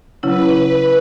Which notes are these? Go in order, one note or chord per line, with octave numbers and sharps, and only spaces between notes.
C#3 F#3 C#4 E4 B4
B4